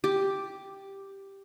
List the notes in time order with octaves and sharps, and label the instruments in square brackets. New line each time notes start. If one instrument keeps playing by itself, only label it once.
[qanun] G4